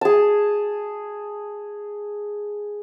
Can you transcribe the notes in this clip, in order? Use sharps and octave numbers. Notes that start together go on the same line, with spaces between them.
G#4 A5